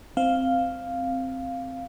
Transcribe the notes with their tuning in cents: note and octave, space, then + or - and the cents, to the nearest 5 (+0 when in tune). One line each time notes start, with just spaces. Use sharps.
C4 +0 F5 +0